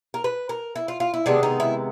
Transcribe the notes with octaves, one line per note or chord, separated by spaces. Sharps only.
A#4
B4
A#4
E4
F4
F4
E4
C3 D#3 G#3 B3 D4
D#4
E4